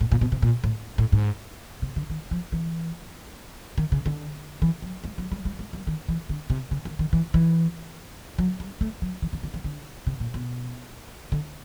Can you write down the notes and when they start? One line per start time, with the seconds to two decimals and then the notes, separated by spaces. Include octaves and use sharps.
0.01 A2
0.12 A#2
0.21 B2
0.32 C3
0.42 A#2
0.64 A2
0.98 A2
1.12 G#2
1.82 C3
1.96 D3
2.10 D#3
2.31 F3
2.52 E3
3.78 D#3
3.92 C#3
4.06 D3
4.62 E3
4.82 F#3
5.04 G#3
5.18 F#3
5.32 G3
5.45 G3
5.59 G#3
5.73 G3
5.87 D#3
6.08 E3
6.29 D3
6.50 C3
6.71 C#3
6.85 D#3
6.99 D#3
7.13 E3
7.34 E3
8.39 F#3
8.60 G3
8.81 A3
9.02 F#3
9.22 E3
9.33 D#3
9.43 D3
9.54 E3
9.64 D3
10.07 C3
10.20 A#2
10.34 B2
11.32 D3